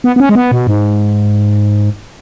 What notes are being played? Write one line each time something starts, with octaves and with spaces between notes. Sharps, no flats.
B3
B3
C#4
G#3
B3
B2
G#2